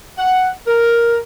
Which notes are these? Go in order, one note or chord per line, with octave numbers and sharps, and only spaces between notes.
F#5
A#4